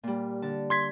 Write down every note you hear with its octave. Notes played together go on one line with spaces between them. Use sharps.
A#2 G3
D3 A5
C6 G#6 B6